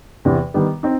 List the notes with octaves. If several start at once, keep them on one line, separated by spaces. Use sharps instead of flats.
E2 C3 E3
D#3 G3 B3
C4 D#4